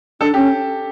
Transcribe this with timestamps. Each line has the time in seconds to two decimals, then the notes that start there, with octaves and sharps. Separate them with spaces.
0.21 D4 A4
0.34 C#4 G4